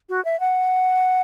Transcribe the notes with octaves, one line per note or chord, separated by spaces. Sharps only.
F#4
E5
F#5